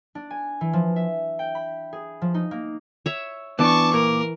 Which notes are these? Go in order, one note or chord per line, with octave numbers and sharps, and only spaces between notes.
D4
G#5
E3
F3
E5
G5
B5
G#4
F3
D#4
A#3
C#5 E5
E3 B3 D4 G5 A5 C#6 D6
A#2 A#4